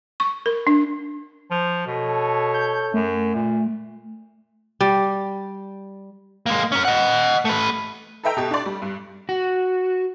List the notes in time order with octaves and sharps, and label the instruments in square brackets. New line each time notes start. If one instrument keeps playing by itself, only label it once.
[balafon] C#6
A#4
D4
[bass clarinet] F3
[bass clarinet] B2 [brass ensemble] A4 C#5
[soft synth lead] G6
[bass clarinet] F#2 [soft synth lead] A3
[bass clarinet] A#2
[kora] G3
[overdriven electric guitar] G#3 A#3
C#4 A#4
D#5 F#5
A3 B4
[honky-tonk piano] A4 B4 D#5 E5 G5 A#5
B2 G4 A4
D4 D5
G3
G2
[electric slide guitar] F#4